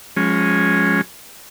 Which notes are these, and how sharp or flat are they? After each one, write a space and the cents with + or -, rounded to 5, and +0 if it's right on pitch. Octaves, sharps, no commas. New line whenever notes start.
F3 +30 G#3 +0 C#4 +0